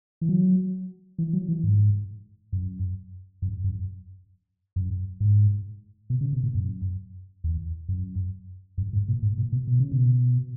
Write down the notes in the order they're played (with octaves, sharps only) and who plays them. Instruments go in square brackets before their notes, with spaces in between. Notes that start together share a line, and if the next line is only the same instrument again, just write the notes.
[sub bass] E3
F#3
E3
F#3
E3
G#2
F#2
F#2
F#2
F#2
G#2
B2
C#3
B2
A#2
F#2
E2
F#2
F#2
G#2
A#2
G#2
A#2
B2
B2
C#3
B2